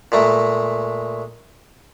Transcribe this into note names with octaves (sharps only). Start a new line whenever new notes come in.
A#2 G#3 A3